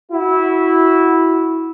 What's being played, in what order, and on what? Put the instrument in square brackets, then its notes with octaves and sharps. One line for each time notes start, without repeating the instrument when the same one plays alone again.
[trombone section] E4 F#4